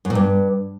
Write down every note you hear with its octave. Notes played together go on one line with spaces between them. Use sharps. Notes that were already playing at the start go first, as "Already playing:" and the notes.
F#2
A#2
G2